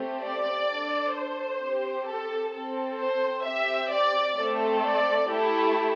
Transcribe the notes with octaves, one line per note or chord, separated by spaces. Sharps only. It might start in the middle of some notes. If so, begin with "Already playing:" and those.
Already playing: A3 C4 G4
D5
D4 A4
C5
C4 G4
A4
C4 A4
C5
C4 G4 E5
D5
A3 C4 A4
D5
A3 E4 G4 A4